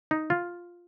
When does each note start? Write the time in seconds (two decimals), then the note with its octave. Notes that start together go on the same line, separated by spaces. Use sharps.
0.11 D#4
0.30 F4